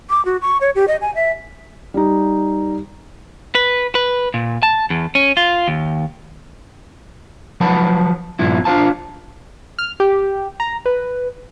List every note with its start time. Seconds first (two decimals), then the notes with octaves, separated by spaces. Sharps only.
0.10 D6
0.25 F#4
0.41 C#6
0.61 C#5
0.75 G4
0.88 D#5
1.01 G#5
1.15 E5
1.94 G3 D#4
3.55 B4
3.95 B4
4.34 A#2
4.63 A5
4.90 E2
5.15 C#4
5.37 F4
5.68 D#2
7.61 F3 F#3 B4 F#5 A5 B5
8.39 G2 A#2 F3 E4
8.65 D4 F4 C5 F5 A5
9.79 F6
10.00 G4
10.60 A#5
10.86 B4